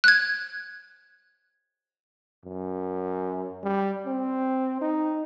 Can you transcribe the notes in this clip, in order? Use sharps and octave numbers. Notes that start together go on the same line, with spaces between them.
F#6 G#6
F#2
G3
C4
D#4